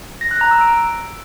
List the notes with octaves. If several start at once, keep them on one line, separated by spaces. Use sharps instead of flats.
A#6
F#6
A#5
E6
D7